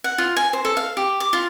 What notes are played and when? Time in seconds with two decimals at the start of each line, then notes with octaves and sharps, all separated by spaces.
0.04 F#5
0.18 F4
0.37 G#5
0.53 C5
0.65 A4
0.77 F5
0.97 G4
1.20 D6
1.33 F4